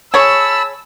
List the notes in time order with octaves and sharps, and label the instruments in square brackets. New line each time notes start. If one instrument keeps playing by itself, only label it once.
[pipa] G#4 C#5 [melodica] A5 B5 [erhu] E6